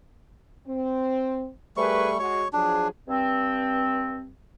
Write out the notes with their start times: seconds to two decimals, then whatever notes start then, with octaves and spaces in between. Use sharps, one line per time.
0.66 C4
1.77 G3 A3 G#4 A#4 B4 C#6
2.19 G#3 F#4 C#5 C#6
2.53 F3 F#3 D4 G#4
3.08 G2 C4